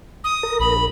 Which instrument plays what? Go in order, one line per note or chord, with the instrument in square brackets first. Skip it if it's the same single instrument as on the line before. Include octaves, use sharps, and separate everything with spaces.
[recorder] D#6
[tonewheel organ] A#4
[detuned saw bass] A#1 [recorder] B5